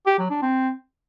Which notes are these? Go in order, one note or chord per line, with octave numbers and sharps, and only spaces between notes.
G4
F#3
D4
C4